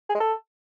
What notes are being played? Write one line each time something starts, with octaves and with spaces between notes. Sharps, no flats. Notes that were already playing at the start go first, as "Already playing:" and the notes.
G#4
G#3
A4